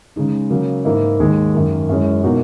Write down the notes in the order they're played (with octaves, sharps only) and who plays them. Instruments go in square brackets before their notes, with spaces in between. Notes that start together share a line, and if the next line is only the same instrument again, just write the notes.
[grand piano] C#3 G#3 D#4
C#3 F#3 A#3
G#2 E3 A#3 E4
D#2 D#3 G#3
F#2 D#3 A#3
F#2 E3 G#3 C#4
B2 A#3 D#4 F#4